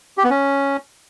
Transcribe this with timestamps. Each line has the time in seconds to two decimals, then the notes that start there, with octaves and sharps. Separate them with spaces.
0.18 G4
0.24 B3
0.30 C#4